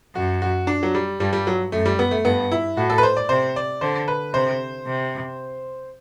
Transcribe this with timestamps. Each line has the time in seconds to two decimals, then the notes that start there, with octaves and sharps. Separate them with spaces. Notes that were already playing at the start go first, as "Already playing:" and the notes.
0.15 F#2 F#4
0.42 F#4
0.67 D4
0.83 F#3
0.95 G3
1.20 G2 G3
1.33 G3
1.47 F#3
1.72 F#2 A3
1.86 G3
1.99 B3
2.11 A3
2.25 G2 B3
2.52 E4
2.77 A2 F#4
2.90 A4
2.98 B4
3.03 C5
3.17 D5
3.29 C3 C5
3.56 D5
3.81 D3 C5
4.08 B4
4.34 C3 C5
4.86 C3